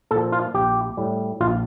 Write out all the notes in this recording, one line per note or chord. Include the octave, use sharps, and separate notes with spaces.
A#2 F3 A4
F4
A#1 G4
A2 G3
A#1 F4